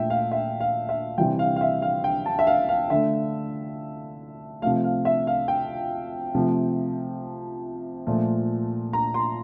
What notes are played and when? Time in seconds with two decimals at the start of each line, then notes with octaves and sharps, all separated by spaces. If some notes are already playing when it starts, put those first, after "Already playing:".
Already playing: A#2 A3 E5 G5
0.10 F5
0.32 E5
0.60 F5
0.89 E5
1.18 C3 E3 G3 G5
1.39 F5
1.56 F5
1.61 E5
1.82 F5
2.04 G5
2.26 A5
2.39 E5
2.47 F5
2.69 F5
2.90 D3 A3 E5
4.62 C3 F3 A3 F5
4.84 F5
5.05 E5
5.27 F5
5.48 G5
6.34 C3 F3 A3
8.07 A#2 F3 A3
8.93 A#5
9.14 C6